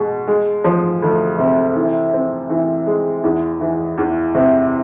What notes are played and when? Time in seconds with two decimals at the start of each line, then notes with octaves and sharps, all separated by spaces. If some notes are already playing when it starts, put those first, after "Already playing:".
Already playing: B2 G#3
0.27 G#3
0.64 F3
1.02 D2
1.38 C3
1.75 E3
2.13 C4
2.49 E3
2.87 G#3
3.24 E2
3.60 E3
3.98 E2
4.35 C3